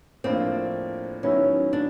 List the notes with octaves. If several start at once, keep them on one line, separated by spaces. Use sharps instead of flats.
A2 F3 A#3 C4 D4 F4
D#3 F#3 B3 C#4 E4
D4